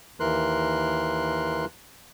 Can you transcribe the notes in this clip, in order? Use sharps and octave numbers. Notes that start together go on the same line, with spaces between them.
D#2 E3 A#4 C6 F#6